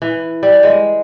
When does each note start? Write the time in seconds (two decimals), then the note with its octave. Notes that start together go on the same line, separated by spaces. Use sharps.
0.02 E3
0.43 G3
0.63 G#3